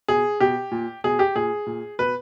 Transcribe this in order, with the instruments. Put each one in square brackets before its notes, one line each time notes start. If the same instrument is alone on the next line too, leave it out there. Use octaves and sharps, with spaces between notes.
[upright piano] B2 G#4
B2 G4
A#2
B2 G#4
G4
A#2 G#4
A#2
B2 B4